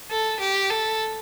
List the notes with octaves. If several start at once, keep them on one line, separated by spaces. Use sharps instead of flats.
A4
G4
A4